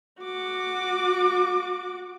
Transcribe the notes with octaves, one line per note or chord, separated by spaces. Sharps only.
F#4 D6